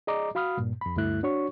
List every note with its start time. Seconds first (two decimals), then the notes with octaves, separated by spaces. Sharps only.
0.07 G#4 D5 D#5 A#5 D6
0.35 F#4 F5 B5 D#6 F6
0.57 G2 A#2
0.81 F2 B5
0.96 D2 G2 A3 E4 F#6
1.23 D4 F#4 C#5 C#6